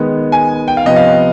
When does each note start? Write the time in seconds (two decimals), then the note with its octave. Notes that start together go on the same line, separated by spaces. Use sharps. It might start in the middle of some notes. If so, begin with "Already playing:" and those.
Already playing: D#3 G#3 B3
0.32 G#5
0.68 G5
0.77 F5
0.85 C3 F3 B3 D#5
0.96 F5